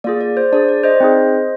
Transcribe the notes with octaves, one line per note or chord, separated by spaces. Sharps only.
A#3 F4 G#4 D5
D5
C5
D4 G#4 D5
D5
C5 D#5
C4 D#4 G#4